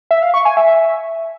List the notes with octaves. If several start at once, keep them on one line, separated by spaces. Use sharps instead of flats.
E5
F5
C#6
G#5
E5